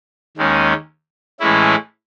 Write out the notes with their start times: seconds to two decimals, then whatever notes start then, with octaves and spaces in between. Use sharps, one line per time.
0.37 D#2 D#3 G#3 C#4
1.40 A2 E3 G#3 C#4 E4